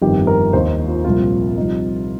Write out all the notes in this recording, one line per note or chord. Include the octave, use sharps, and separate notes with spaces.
G1 F2 D#3 G4
A#4
D#2 D#3 A#3 D#4 C5
F4
C2 A#2 F3 C4 F4
C2 C3 F3 D#4